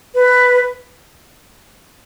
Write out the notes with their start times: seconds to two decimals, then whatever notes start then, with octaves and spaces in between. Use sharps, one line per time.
0.15 B4